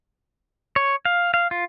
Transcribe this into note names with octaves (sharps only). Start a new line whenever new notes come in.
C#5
F5
F5
F4